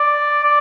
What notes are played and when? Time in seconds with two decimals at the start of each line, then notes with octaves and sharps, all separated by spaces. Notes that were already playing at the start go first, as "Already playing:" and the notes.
Already playing: D5
0.44 D5